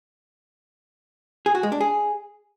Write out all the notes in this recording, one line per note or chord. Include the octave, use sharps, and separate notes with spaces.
G#4
F#4
G#3
D4
G#4